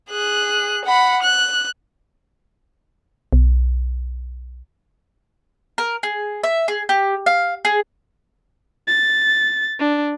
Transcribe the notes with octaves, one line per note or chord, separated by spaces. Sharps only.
G#4 F#6
F#5 B5
F#6
B1
A#4
G#4
E5
G#4
G4
F5
G#4
A6
D4